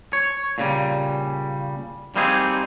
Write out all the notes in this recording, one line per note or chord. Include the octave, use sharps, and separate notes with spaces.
C#5
A#2 C#3 G3
G3 A#3 C4 D#4 G#4